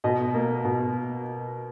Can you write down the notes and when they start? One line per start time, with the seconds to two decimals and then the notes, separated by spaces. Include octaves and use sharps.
0.04 B2 D#5
0.34 A#3
0.64 B2